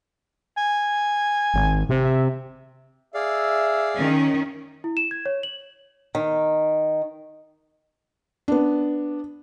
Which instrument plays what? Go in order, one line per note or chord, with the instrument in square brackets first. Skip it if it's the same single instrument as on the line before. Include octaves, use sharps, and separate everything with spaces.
[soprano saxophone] G#5
[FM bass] G#1
C3
[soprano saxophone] E5
[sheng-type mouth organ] G#4 D5 F5 [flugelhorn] E5
[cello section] D#3 C#4
[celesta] E4
E7
G#6
C#5
F#7
[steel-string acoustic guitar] D#3
[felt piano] B3 D4